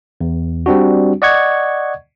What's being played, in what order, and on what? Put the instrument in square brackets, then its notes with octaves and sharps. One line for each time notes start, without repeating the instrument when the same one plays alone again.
[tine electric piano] E2
G3 C4 D4 F#4
D5 D#5 F#5 C#6 G#6